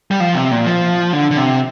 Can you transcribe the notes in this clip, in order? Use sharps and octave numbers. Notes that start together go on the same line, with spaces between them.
G3
F3
C3
A#2
F3
D3
D3
C3